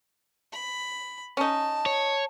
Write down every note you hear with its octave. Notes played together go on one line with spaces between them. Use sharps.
B5
C#4 D#4 A5
C#5